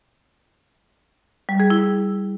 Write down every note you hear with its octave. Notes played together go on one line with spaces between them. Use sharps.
G3
G#4
E4